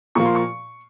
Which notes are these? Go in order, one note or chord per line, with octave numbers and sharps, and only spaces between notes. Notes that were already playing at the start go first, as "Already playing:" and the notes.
A#2 F3 A#3 C#6
C6
C#6